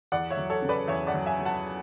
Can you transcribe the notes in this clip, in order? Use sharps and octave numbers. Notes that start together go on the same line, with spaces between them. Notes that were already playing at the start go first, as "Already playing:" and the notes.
E2 D5 F#5
C#5 E5
F#3
A4 C#5
C#3
B4 D5
E2 C#5 E5
D5 F#5
F#3
E5 G#5
F#3
F#5 A5